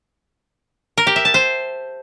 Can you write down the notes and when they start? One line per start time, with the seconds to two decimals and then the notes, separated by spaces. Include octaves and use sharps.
0.98 A#4
1.07 G4
1.16 E5
1.25 A5
1.34 C5